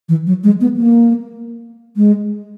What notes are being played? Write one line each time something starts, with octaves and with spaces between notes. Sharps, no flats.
E3
F#3
G#3
B3
A#3
G#3